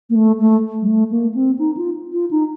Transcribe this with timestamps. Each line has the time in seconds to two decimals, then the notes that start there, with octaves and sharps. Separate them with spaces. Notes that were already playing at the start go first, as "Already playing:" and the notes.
0.10 A#3
0.15 A3
0.40 A3
0.82 G3
0.87 A3
1.11 A#3
1.34 C4
1.59 D#4
1.77 F4
2.13 F4
2.31 D#4